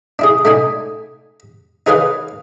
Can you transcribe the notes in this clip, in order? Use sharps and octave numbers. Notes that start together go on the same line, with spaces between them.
D4 E4 G#4
A3 D4 D#4 G#5
D#4 G#4 A#4 B4 C#5 F5